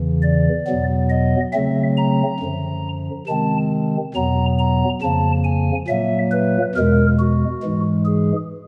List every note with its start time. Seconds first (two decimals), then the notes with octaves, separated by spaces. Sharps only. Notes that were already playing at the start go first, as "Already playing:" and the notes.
Already playing: E2 C#3 E3
0.22 D5
0.67 E2 B2 F#3 B3
1.10 D#5
1.53 C#3 F#3 A3 C4 E5
1.97 A#5
2.40 F#2 D3 F3
3.27 C3 D#3 G#3 C4 A5
4.14 E2 B2 F#3 B3 A#5
4.58 A#5
5.02 F2 C#3 F3 A#3 A5
5.44 G#5
5.88 A#2 F#3 A#3 E5
6.32 B4
6.75 E2 B2 G#3 A#4
7.19 F#4
7.63 G#2 E3 G#3
8.06 G#4